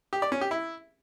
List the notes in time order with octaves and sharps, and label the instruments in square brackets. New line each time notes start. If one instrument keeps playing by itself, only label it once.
[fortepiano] G4
D5
C#4
G4
E4